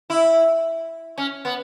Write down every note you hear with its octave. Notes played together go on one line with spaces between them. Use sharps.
E4
C#4
B3